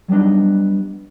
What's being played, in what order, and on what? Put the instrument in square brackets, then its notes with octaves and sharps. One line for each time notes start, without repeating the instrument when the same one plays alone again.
[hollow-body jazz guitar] F#3 G3 B3 D4 D#4